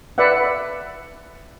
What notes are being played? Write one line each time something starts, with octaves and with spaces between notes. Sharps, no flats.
B4 D5 E5 F#5